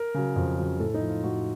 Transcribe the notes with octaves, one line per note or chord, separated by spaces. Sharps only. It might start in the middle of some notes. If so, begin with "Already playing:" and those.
Already playing: A#4
C#3 F#3
F2
C#3 F#3
A2 A4
D#4
F3
F4
A2 F#4